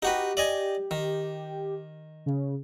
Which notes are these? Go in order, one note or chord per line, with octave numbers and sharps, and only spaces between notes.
D#4 F#4 G4 B4
D5 D#5 G#5
D#3
C#3